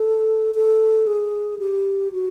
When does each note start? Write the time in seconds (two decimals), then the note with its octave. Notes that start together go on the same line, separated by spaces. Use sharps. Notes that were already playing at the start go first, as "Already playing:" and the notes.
Already playing: A4
0.55 A4
1.07 G#4
1.59 G4
2.12 F#4